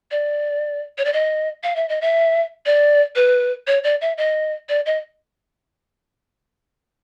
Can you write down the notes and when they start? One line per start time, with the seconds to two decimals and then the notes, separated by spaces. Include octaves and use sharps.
0.11 D5
0.98 C#5
1.05 D5
1.13 D#5
1.63 F5
1.76 E5
1.89 D#5
2.01 E5
2.66 D5
3.16 B4
3.67 C#5
3.84 D5
4.01 E5
4.18 D#5
4.69 D5
4.86 D#5